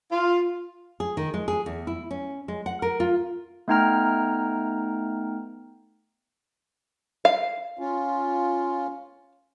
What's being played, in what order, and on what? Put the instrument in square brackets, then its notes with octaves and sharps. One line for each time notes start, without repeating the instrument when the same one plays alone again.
[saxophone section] F4
[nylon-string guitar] G#4
D#3
G#3
G#4
E2
E4
C#4
G#3
F#5
A#4
F4
[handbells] A3 B3 D#4 G5 A#5 F6
[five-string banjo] F5
[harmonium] C#4 F4